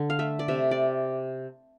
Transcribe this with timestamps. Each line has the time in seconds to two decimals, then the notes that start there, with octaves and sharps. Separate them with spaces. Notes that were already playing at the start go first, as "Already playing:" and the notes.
Already playing: D3
0.10 F5
0.19 A3 E5
0.39 D5
0.48 C3 E5
0.71 D5